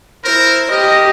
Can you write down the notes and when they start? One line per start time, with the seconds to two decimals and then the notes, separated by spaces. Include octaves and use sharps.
0.24 E4 A#4 C5
0.70 G4 A#4 D#5